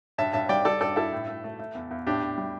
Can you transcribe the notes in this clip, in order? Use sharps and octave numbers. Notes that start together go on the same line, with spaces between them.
G2 E5 A5
G2 E5 A5
G3 D5 G5
G3 A4 D5
G2 A4 D5
G2 E4 A4
A2
A3
A3
A3
E2
E2
A2 D4 G4
A2
G3